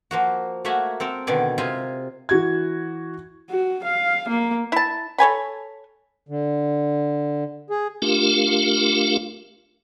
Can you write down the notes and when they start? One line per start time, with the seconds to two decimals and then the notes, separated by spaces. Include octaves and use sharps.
0.11 F3 A#3 F#4
0.65 A3 A#3 F#4 E5 F#5 G#5
1.00 C4 A4 A#4
1.27 B2 D3 D#3 D5 G#5
1.58 C3 F4 D#5 G#5
2.29 E3 F#4 G#6
3.50 F#4
3.84 F5
4.29 A#3
4.72 E4 A5
5.18 A4 C#5 G#5 B5
6.29 D3
7.70 G#4
8.02 A3 D4 F4 G4 A#4 F5